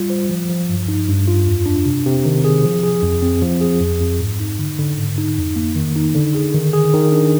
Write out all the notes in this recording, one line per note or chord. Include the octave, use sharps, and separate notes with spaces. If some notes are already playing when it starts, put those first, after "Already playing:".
Already playing: G3 F4
C5
F3
F3
G2
D#4
G2
F4
F2
D4
C3
C3
D#3
G#4
F3
G#4
F2
C4
F3
G#4
F2
F2
G#2
D#4
D3
D3
G#2
D#4
F2
A#3
D#3
D#4
D3
G#4
D#3
G#4
D#3
D4